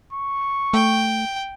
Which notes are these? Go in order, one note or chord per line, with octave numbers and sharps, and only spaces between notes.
C#6
A3 G5